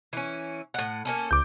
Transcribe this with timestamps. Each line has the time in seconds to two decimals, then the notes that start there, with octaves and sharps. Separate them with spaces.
0.13 E3 C#4
0.74 A2 F#5
1.05 A#3 C#4 A4
1.31 C#2 D6 G6